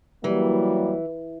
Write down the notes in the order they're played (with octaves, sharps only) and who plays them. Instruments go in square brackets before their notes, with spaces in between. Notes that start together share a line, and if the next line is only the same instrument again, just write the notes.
[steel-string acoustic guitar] E3 [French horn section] F#3 G3 A#3